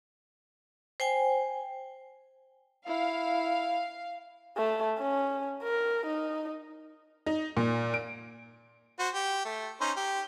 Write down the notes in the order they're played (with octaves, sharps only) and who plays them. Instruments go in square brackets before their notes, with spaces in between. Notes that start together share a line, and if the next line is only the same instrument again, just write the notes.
[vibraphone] C5 G5 G#5
[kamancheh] E4 [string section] F5
[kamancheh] A3 A5
C#4
A#4
D#4
[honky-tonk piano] D#4
A#2
D7
[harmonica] F#4 C5
G4
A3
C#4 D#4 C5
G4